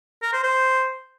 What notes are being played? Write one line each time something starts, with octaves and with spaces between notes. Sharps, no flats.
A#4
C5
C5